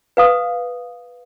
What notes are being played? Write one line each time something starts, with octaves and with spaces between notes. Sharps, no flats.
B4 F5 D#6